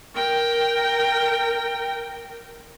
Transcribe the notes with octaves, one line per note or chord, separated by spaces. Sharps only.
A#4 G5